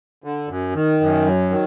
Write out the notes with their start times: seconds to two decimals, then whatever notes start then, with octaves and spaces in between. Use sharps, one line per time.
0.24 D3
0.49 F#2
0.75 D#3
1.01 F#2
1.26 F#3
1.50 D#3